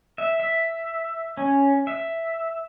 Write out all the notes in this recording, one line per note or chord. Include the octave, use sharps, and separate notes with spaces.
E5
E5
C#4
E5